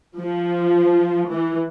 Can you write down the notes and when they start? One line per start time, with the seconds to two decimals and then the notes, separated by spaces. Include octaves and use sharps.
0.18 F3
1.32 E3